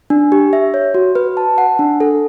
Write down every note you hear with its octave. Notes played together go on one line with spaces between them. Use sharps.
D4
G4
E5
C#5
F#4
B4
A5
F#5
D4
A4